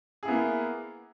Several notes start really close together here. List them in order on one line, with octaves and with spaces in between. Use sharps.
G#4 E4 B3 A#3